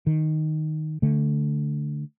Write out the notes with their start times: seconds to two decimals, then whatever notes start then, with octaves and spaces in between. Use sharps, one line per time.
0.07 D#3
1.02 D3 A3